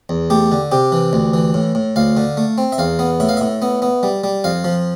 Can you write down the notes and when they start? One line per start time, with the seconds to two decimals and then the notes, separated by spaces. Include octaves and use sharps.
0.09 E2
0.30 A3 G4
0.52 D3
0.72 C3 G4
0.92 E3
1.13 D2
1.33 E3
1.54 A2
1.75 A2
1.96 D2 F5
2.17 D3
2.37 A3
2.58 C4
2.72 E5
2.78 E2 F5
2.99 B3
3.20 A2 E5
3.29 F5
3.37 A2 E5
3.62 B3
3.82 B3
4.03 G3
4.24 G3
4.44 F2 F5
4.64 F3